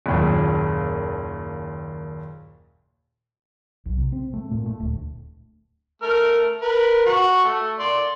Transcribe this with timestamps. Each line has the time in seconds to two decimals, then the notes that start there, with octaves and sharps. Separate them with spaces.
0.06 F#1 D#2 A#2
3.86 B1
3.97 C3
4.12 C4
4.34 A3
4.51 A#2
4.66 A3
4.80 D1
6.02 A3 A#4 F6
6.62 A#4 B4
7.06 F#4 C#6
7.44 A3
7.79 D5 C6